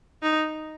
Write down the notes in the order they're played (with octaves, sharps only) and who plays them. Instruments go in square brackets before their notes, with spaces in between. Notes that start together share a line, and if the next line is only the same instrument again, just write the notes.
[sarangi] D#4